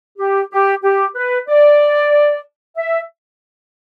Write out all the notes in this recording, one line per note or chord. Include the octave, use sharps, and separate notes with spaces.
G4
G4
G4
B4
D5
E5